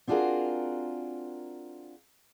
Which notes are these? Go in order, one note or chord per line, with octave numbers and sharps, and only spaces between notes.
C4 D4 F4 F#4 G#4 A#4